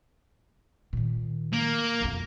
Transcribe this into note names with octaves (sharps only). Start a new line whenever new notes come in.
A#2 D#3
A#3
B1 F2